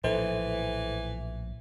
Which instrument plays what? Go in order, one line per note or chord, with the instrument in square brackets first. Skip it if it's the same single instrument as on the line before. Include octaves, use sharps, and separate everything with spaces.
[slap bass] A#1 A2 F3 [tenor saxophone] E3 [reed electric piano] A4 C5